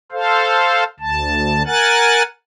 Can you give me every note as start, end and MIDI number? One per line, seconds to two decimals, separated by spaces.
0.12 0.84 69
0.12 0.84 72
0.12 0.84 77
1.00 1.62 38
1.00 1.62 81
1.66 2.22 70
1.66 2.22 78
1.66 2.22 80
1.66 2.22 90
1.66 2.22 93